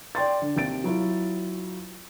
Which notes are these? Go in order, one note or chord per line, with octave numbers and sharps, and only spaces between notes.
D5 G5 C6 A6
D3
D#2 C3 A6 D7
F#3 E4 F4